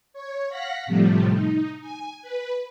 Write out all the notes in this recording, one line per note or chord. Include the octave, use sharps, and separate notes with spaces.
C#5
F5 F#5 F#6 A#6 B6
A2 C3 F3 G3 A3
D#4
G#5
B4